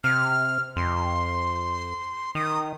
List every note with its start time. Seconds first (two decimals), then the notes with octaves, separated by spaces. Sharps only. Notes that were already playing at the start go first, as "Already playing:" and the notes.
0.04 C3 F6
0.76 F2 C6
2.35 D#3 D#6